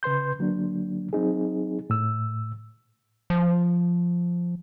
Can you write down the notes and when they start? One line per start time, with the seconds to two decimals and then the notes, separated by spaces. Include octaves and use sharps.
0.03 C#3 B4 C6 G6
0.39 D3 F#3 A#3 D4
1.13 F#3 C4 D#4 G#4
1.90 A2 E6
3.30 F3